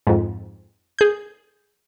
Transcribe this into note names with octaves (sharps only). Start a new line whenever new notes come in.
F2 G#2
G#4 G6